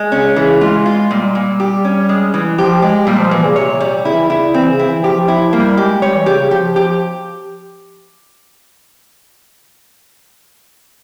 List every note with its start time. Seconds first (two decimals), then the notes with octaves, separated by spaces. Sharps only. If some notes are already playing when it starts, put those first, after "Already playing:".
Already playing: G#3
0.12 C#3 C#4
0.36 C#3 E3
0.61 G#3 F4
0.86 F4
1.10 A#2 G3
1.35 A#2
1.60 G4
1.84 C#4
2.09 G#3
2.34 E3
2.58 F3 G4
2.82 G#3 G4
3.07 A#2 G3
3.19 F3
3.31 A#2 E3
3.44 C#3
3.56 C3 C#5
3.81 G3
4.05 C#3 E4
4.13 E3
4.22 C#3
4.30 E4
4.54 E3 C4
4.71 C#3
4.79 E4
4.88 E3
5.04 F3 G4
5.28 E4
5.53 G3 A#3
5.77 G#3 G4
6.01 G3 C#5
6.14 E3
6.26 C#3 G4
6.39 C#3
6.51 F3 G4
6.76 F3 G4